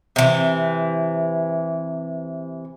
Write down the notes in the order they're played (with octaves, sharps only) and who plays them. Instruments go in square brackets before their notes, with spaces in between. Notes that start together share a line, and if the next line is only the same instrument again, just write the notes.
[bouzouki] C3 E3